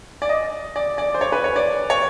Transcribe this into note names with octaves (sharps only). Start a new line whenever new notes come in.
D5
D#5
D5
D5
C5
C#5
B4
C#5
D5
C#5